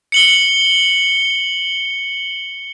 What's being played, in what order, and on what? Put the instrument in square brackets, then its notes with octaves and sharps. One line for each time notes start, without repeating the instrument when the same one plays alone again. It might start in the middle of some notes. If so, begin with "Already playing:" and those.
[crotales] C#7 F#7 G7